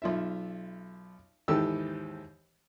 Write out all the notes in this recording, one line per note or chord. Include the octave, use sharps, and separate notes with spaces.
B1 F4 E5
D#2 G#2 E3 G4 A4 E6